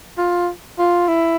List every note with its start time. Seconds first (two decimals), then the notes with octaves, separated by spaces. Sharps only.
0.18 F4
0.78 F4
1.08 E4